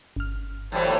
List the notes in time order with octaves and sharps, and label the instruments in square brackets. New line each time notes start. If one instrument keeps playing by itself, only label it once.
[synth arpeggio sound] G1 F6
[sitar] A2 E3 G3 [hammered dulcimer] F#3 [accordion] C5 A5
[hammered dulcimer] D#3 A3 A#3